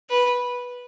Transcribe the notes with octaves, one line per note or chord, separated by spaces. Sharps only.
B4